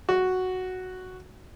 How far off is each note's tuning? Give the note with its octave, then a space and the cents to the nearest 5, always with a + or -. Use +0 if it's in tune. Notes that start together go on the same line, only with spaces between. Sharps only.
F#4 +0